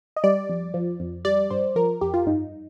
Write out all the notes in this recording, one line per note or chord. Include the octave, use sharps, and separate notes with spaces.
D#5
G3 D5
F2
F3
F2
G3 D5
G2 C5
F3 A#4
F2 G4
F4
G2 D#4